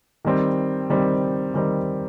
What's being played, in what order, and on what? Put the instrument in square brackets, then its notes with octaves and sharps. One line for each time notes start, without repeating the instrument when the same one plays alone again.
[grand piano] D#3 G3 C4
D#3 G3 C4
D#3 G3 C4